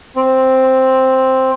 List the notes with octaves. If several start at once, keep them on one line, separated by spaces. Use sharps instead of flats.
C4